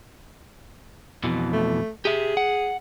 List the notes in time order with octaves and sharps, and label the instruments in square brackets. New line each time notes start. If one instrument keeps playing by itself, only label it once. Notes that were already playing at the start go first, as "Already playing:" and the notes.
[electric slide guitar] F2 B2 E3
[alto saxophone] A3
[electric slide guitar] G4 E5 [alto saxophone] G#4
[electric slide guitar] F#5